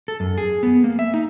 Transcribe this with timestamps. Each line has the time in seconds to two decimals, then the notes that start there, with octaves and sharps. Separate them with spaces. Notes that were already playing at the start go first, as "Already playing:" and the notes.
0.08 A4
0.20 F#2
0.38 G#4
0.63 B3
0.84 A#3
0.99 E5
1.14 D#4